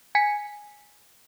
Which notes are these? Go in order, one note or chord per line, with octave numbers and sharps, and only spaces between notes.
G#5 B6 C#7